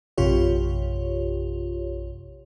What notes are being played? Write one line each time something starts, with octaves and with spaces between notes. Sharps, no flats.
A#1 F#2 C3 F4 G4 C#5